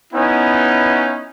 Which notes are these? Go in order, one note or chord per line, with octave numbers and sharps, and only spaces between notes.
B3 C#4 D#4 E4